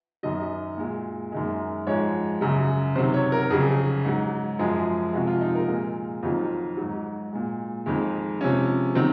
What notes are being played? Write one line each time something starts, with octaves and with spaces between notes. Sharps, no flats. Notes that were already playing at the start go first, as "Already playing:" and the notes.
F#2 D#3 F#3 D#5
A#2 G#3
F#2 D#3 G#3
G#2 F3 G#3 C#5
F#2 C#3 F#3
C3 D#3 F#3 C5
C#5
A#4
F2 C#3 F#3 G#4
G#2 F#3
F#2 F3 G#3 G#4
C3 F3 G#3 F#4
F4
D#4
A#4
A#2 G#3
F2 D#3 F#3 F4
G#2 F#3
A#2 G#3
F2 D#3 G#3
C3 F3 G#3 C#4
D#3 F#3 C4